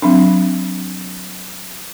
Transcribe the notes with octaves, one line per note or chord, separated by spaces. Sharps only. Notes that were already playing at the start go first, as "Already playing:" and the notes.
F#3 C4 D4